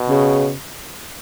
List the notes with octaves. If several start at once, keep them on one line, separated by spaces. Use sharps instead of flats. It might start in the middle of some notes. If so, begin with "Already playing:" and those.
Already playing: B2
C#3